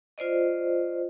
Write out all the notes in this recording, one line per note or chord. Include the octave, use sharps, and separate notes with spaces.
F4 C5 D5 D#5